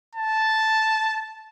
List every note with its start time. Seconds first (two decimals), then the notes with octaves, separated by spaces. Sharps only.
0.15 A5